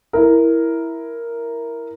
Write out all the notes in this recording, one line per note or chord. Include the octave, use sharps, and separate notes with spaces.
E4 A#4